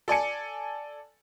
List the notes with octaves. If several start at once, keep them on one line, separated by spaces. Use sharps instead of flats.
A4 D5 G#5 C#7